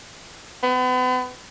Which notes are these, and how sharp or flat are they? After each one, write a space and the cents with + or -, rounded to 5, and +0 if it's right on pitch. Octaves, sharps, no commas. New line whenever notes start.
B3 +40